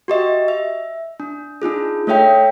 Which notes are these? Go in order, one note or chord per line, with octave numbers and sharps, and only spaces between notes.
F#4 G4 D#5 E5
E5
D4
D4 D#4 F4 G#4
A3 A4 C#5 E5 G5 B6